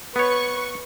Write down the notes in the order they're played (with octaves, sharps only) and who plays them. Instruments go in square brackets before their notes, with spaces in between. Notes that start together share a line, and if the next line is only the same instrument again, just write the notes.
[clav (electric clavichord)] B3 C#5 [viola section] B4 [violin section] C#6